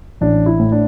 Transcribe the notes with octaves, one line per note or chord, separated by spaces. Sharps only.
A1 D4
E4
A2
D4